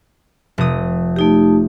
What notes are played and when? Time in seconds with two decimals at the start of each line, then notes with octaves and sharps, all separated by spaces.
0.58 F1 D#6
1.16 A3 D#4 G4